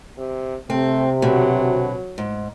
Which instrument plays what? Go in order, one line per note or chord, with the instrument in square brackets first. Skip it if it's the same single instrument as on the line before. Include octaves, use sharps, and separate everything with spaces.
[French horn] C3
[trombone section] C3 [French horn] A3 [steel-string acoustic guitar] C4
[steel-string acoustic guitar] B2 D3 [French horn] F#3
[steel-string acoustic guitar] G#2